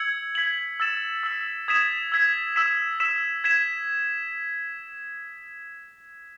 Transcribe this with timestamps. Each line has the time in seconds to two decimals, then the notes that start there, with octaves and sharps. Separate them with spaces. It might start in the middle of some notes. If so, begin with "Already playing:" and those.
Already playing: E6 G#6 C#7 F#7
0.35 G#6 B6 F#7
0.80 E6 A6 E7
1.23 E6 B6 F#7
1.68 D#6 G#6 B6 E7
2.12 E6 G#6 B6
2.56 E6 B6 E7
3.00 E6 B6 E7
3.44 G#6 B6 E7